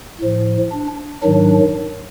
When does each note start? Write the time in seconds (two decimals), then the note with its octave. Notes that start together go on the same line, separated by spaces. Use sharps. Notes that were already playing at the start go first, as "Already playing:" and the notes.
0.21 A2 F3
0.72 D4
1.23 G#2 D#3 F#3 D4